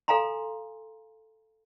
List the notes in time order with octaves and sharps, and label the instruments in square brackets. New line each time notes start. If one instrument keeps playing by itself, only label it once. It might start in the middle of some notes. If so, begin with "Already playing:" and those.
[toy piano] A4 F5 G#5 A#5 C6